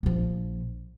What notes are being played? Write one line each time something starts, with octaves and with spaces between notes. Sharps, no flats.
A#1 F3